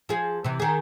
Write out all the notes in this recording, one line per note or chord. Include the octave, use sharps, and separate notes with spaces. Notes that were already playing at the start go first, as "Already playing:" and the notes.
F3 F4 G#4
C3 E3
D#3 G#4